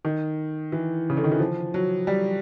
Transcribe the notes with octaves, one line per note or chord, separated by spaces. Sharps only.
D#3
E3
C#3
D3
D#3
E3
F3
F#3
G3